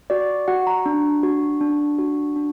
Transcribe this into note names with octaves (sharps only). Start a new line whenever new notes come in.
F#4 D5
F#4 F#5
A#5
D4
F#4
D4
F#4
D4